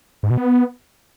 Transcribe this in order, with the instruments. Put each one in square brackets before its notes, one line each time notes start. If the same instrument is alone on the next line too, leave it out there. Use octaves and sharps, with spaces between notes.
[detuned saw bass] G#2
B2
B3